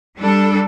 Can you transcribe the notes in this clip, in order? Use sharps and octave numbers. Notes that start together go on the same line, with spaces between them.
G3 D4 A4